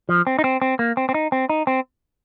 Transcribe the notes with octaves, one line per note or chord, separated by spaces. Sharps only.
F3
C4
D#4
C4
C4
A#3
C4
C4
D#4
C4
D#4
C4